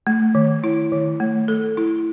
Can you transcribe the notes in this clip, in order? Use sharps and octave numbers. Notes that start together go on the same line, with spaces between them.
A3
D#3
E4
D#3
A3
A4
E4